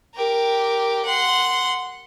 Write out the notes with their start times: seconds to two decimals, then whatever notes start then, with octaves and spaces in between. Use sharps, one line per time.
0.15 G4 A#4
1.05 F#5 C6